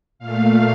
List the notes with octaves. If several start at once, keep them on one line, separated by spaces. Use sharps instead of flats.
A#2 A3 F5